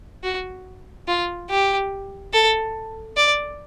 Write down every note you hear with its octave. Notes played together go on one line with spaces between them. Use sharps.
F#4
F4
G4
A4
D5